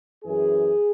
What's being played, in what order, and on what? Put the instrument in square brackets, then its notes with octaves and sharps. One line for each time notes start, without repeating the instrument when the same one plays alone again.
[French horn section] F#2 E3 G#4